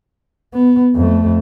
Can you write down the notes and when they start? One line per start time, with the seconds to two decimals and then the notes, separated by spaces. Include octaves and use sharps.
0.54 B3
0.95 F2 A3